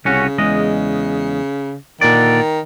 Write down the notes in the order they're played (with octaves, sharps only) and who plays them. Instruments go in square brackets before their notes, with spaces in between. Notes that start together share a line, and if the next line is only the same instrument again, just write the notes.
[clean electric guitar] C2 C#4 F#4 [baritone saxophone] C#3
[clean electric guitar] E2 G#3 D#5
[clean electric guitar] A#2 D3 D5 [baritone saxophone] D#3